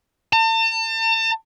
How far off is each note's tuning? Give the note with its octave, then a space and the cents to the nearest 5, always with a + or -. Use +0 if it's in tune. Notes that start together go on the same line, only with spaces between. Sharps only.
A5 +40